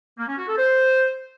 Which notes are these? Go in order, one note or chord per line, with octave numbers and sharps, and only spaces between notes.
A#3
C#4
F#4
A4
C5